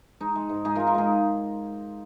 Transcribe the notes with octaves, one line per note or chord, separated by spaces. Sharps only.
G#3 D#4
G#3
G#2
G#2 D#4 G#4
G#3 F4 A#4
F4 A#4
G#3 D#4 G#4